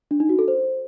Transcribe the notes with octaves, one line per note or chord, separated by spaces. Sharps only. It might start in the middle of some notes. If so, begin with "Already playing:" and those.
D4
D#4
F#4
A4
C5